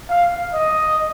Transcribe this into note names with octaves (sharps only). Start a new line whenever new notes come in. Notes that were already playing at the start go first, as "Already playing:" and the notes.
F5
D#5